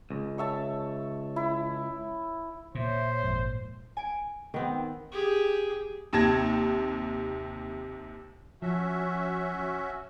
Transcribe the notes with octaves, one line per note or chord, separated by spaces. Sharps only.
C#2
C#5 E5 A5
E4
A#2 C5 C#5 E5
G#1 F2 G#2
G#5 D7
D#3 B3 C4
G4 G#4
D#2 C3 A5 G#6 A#6
F3 C#4 F#4 E5